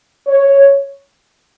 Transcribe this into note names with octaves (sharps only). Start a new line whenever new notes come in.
C#5